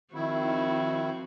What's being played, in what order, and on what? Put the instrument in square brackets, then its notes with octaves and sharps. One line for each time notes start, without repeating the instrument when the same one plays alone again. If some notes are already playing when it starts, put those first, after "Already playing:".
[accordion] D#3 E4 [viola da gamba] F3 C4 F#4